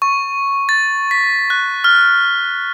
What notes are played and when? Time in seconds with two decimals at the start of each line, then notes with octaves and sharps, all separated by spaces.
0.02 C#6
0.69 A6
1.11 B6
1.50 F#6
1.84 F6